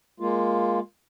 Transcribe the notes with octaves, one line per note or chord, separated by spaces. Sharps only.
G#3 A#3 F4